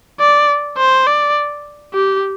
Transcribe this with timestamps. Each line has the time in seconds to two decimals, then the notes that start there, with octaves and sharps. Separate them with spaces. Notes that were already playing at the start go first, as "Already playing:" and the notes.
0.20 D5
0.78 C5
1.07 D5
1.94 G4